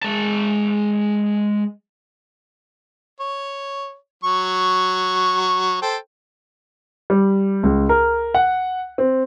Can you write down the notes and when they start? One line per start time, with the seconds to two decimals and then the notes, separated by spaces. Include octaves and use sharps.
0.03 G#3 A5
3.20 C#5
4.24 F#3 C#6
5.82 A4 C5 G5
7.10 G3
7.63 C#2
7.89 A#4
8.34 F#5
8.98 C4